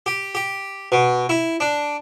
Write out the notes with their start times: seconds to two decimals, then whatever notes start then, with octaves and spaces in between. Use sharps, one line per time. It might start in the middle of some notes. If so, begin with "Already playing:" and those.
0.06 G4
0.35 G4
0.92 B2
1.29 E4
1.60 D4